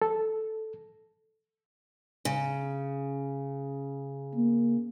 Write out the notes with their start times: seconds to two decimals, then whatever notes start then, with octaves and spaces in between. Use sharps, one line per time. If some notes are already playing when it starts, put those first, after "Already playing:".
0.02 A4
2.25 C#3
4.35 A#3